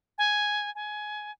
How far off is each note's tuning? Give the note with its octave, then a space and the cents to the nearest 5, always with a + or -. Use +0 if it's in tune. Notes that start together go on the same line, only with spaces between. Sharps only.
G#5 +5
G#5 +20